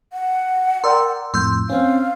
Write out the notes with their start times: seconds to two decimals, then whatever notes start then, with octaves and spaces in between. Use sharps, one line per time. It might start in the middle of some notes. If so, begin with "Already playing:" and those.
0.13 F#5
0.84 A#4 D5 G5 C6 E6
1.34 F2 A2 C6 E6 G6
1.70 C4 C#4 F5